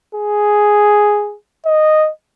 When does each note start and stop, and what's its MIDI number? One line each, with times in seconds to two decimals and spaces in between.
0.15 1.36 68
1.66 2.10 75